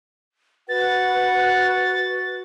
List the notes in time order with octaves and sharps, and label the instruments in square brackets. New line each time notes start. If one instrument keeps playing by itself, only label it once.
[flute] F#4 [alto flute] B4 [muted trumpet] F#5 [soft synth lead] A6